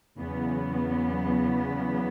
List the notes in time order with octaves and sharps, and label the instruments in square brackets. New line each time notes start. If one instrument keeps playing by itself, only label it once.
[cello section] E2 C#3 F#3 B3